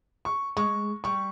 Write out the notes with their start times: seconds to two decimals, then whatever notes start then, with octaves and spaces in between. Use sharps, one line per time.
0.25 C#6
0.57 G#3 C#6
1.04 G3 C#6